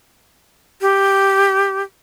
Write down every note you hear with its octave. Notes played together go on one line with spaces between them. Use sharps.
G4